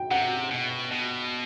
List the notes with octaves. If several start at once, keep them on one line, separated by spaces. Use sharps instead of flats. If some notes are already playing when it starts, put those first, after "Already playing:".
Already playing: G5
C3 F#5
B2
B2